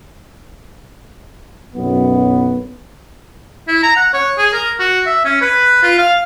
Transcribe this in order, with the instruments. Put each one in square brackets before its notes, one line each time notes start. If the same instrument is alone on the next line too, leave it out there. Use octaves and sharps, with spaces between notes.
[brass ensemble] B1 F#2 B3
[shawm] E4
A#5
F#5
C#5
G#4
A#4
F#4
E5
C#4
B4
F4
F5